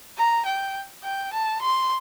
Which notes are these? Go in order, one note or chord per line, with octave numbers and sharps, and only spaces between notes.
A#5
G5
G5
A5
C6